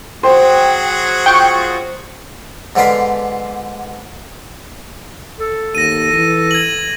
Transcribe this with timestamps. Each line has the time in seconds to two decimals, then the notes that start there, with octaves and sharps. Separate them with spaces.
0.23 F#3 F#4 G#4 C5 G5
1.26 F4 G5 C#6
2.76 G#2 D3 B3 D5 F5 B5
5.40 A4
5.75 D#2 A#6 D#7
6.13 E3
6.51 G#6 F#7